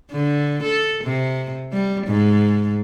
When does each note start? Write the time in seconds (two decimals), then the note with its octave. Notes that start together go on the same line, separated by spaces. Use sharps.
0.11 D3
0.63 A4
1.04 C3
1.72 G3
2.07 G#2